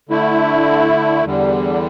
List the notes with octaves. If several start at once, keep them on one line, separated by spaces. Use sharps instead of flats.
D3 A3 E4
E2 D3 G3